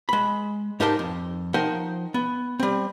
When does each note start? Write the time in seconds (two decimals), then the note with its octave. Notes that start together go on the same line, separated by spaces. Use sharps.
0.09 G#3 B5
0.80 G#2 D#4 G4 A#4 A5 C6
0.99 F2
1.54 F3 D#4 A#4 C5 F#5 G5
2.14 B3
2.60 G3 C4